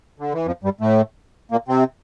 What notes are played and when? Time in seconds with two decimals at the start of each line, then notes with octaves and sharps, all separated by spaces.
0.19 D3
0.33 E3
0.46 F2 F3
0.63 G2 G3
0.81 A2 A3
1.51 A#2 A#3
1.68 C3 C4